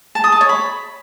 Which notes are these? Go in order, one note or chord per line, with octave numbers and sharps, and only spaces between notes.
A5
D#6
A5
C#5
B5